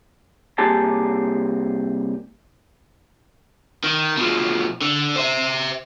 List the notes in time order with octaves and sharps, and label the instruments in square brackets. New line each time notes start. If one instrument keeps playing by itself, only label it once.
[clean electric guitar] C2 A#3 G4 G#4 A5
[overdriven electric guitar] D#3
B2 F3
D3
C5 E5